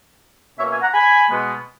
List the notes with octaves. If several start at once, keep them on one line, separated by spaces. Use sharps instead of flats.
B2 A#3 C#4 C#5 E5
E5 G#5
F#5 A#5
G#5 B5
B2 G#3 B3